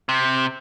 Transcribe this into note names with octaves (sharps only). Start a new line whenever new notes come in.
C3